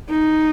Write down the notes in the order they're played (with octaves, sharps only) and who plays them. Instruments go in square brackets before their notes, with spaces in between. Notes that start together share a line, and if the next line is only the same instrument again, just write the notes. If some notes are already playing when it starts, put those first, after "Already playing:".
[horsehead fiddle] D#4